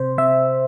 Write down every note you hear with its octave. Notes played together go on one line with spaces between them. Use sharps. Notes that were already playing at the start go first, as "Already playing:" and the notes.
Already playing: C3 C5
C3 E5